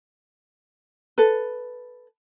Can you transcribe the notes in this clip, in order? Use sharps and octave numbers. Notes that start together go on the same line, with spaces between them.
A4 B4